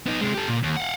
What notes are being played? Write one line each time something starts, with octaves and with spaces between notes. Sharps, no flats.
B3 D#4
C3 G#3
G4 A4
A#2
D#2
F5 F#5